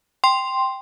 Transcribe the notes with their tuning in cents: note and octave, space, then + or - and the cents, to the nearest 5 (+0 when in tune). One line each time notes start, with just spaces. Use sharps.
G5 +0 C6 +0